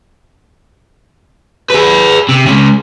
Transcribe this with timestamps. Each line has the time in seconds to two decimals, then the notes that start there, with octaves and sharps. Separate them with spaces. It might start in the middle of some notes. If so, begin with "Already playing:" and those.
1.70 G#4 B4
2.29 C3
2.46 C#3 G#3